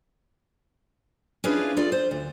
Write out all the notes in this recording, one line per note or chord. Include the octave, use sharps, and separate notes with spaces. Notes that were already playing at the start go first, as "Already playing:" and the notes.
C#4 D4 E4 F4 G#4 B4
F4 A4 D5
C5
D2